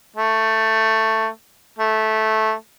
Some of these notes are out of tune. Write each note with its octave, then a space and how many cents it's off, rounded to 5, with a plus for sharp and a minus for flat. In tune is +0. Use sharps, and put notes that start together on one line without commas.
A3 +10
A3 -10